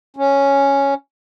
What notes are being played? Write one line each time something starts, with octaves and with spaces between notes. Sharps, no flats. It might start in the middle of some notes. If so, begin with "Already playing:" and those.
C#4